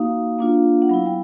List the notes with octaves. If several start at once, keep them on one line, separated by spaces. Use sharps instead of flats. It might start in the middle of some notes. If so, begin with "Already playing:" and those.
Already playing: A#3 D#4 F#4 F5
A#3 D4 F4
F#5
F#3 B3 E4 F5
G5